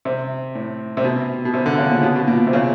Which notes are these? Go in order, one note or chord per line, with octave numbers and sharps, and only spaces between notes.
C3
A2
C3
B2
B2
C3
D3
C#3
A#2
B2
B2
A#2
C3
C#3